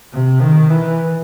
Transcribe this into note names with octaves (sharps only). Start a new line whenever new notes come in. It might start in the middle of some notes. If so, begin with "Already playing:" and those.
C3
D#3
E3